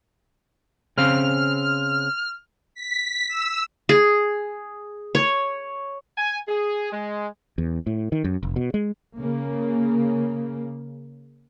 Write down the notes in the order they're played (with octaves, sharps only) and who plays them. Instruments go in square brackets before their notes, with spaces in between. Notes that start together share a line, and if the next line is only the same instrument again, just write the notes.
[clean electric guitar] C#3 C4 F5 [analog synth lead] F6
[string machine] B6
E6
[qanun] G#4
C#5
[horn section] G#5
G#4
G#3
[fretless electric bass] E2
A2
D#3
F#2
F1
B2
G#3
[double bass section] C#3 A#3